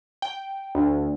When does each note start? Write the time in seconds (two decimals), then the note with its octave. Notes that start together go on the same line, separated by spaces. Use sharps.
0.22 G5
0.75 D2